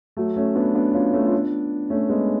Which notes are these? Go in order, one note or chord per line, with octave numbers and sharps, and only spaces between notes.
F#3 A3
A3 C#4
B3 D4
B3 D4
C#4 F4
A3 C#4
F4
B3 D4
A3 C#4
G#3 B3